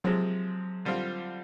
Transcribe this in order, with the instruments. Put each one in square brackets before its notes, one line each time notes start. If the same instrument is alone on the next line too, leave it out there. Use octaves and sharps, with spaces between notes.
[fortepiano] C3 F3 G#3 C4 [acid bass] F#3
[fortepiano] D3 G3 C4 F4